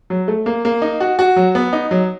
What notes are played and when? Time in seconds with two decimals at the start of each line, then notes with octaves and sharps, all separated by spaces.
0.10 F#3
0.28 A3
0.46 A#3
0.65 A#3
0.82 D#4
1.00 F#4
1.19 F#4
1.36 F#3
1.55 B3
1.73 D#4
1.91 F#3